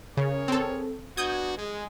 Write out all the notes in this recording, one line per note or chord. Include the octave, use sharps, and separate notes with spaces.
C#3 G#4 A#4 C#5
C4 A4
B3 D4 F#4 D#6 G6 G#6
G#3